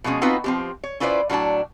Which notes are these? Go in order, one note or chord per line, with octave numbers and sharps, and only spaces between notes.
B2 F3 G#3 A#3 C#4
B3 C4 D#4 F4 F#4 B4
F3 C4 G4
C#5
C#4 E4 F4 B4 C5 D5
A2 F#3 C#4 D4 A5